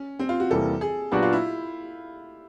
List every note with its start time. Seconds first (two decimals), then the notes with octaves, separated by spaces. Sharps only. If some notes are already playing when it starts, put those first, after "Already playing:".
Already playing: C#4
0.19 C4
0.29 F4
0.40 F#4
0.50 E2 C3 E3 G3 A#3 A4
0.81 G#4
1.12 A#2 F#3 B3 D4 F#4 G4
1.23 F4
1.33 E4